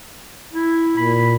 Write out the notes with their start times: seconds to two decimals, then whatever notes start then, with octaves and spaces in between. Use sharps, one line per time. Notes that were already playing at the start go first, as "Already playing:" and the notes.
0.54 E4
0.97 A#2 B5